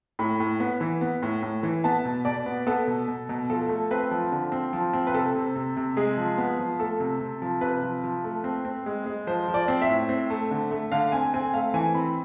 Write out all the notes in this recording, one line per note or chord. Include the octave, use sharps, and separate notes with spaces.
A2 B5
A2
B3
E3
B3
A2
A2
E3
B3 A5
B2
B2 D5
B3
B3 A4
B2
B2
B2
F3 A4
A3
C4 B4
F3
D3
C4
F3
C4
B4
C3 A4
C3
C3
C3
G#3 G#4
F3
B3
F3
A3 A4
C3
C3
F3
C3 B4
F3
F3
A3
C4
C4
G#3
G#3
F3 C5
F3
D5
C4
E5
A2
C4
A3
D3
A3
D3 F5
C4 G#5
C4 G#5
A3 F5
E3 G#5
C4 B5